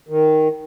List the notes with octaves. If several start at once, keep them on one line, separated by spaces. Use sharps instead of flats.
D#3